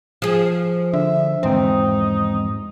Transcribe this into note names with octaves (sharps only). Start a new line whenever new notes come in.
F3 G#4
D3 E5
E2 G#2 C4 D#4 G5